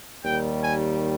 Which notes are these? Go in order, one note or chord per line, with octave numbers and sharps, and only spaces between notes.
D#2 D#3 G3 G5
G#5